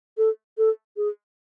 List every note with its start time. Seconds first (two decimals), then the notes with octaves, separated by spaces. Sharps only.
0.18 A4
0.58 A4
0.97 G#4